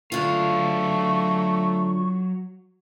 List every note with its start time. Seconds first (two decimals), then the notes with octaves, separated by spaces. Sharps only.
0.12 D3 F#3 A3 F4 F5 C#6